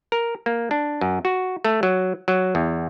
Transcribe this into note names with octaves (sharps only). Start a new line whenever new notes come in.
A#4
A#3
D4
F#2
F#4
A3
F#3
F#3
E2